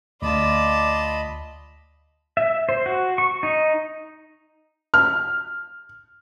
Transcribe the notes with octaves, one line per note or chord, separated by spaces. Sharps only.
D2 F4 D5 D#5 A5 B5
E5
C5
F#4
C#6
D#4
F6